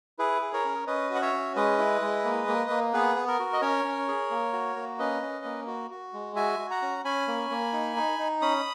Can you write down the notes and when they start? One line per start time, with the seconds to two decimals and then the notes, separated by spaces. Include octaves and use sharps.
0.19 E4 G#4 B4
0.42 G#4
0.53 A#4 C#5
0.65 C#4
0.87 C#4 B4 D#5
1.10 F#4 F#5
1.22 C#5 E5
1.33 C#4
1.56 G#3 B4 D#5
1.78 E4
2.01 G#3
2.25 A#3
2.47 A#3
2.70 A#3
2.93 B3 G#4 B4
3.16 B3
3.28 A#4
3.39 F#4
3.53 D#5
3.61 C#4 A#4 C#5
3.84 C#4
4.08 G#4
4.31 A#3
4.53 F#4
4.76 A#3
4.99 C#4 B4 D#5
5.22 C#4
5.45 A#3
5.67 F#4
5.91 F#4
6.13 G#3
6.36 F#4 E5 G#5
6.59 F#4
6.70 F#5 A#5
6.82 C#4
7.04 C#4 G#5 B5
7.28 A#3
7.50 A#3
7.73 D#4
7.96 D#4
8.19 D#4
8.42 C#4 B5 D#6